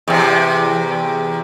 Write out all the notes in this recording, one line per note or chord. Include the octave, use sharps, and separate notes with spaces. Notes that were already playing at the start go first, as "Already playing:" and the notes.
E2 C3